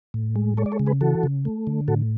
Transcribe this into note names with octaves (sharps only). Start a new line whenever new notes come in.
A2
G#3
G#3 A4 C#5
D5
A4 C#5
C#3
G#4 B4
E3 F#4 A4
C#3
A3
D3
A2 F#4 A4